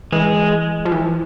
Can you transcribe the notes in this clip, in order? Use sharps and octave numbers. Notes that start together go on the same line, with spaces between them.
E3 G#3
F3
E3